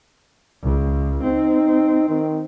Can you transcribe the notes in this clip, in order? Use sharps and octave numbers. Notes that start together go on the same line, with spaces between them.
C#2
C4 D#4
D#3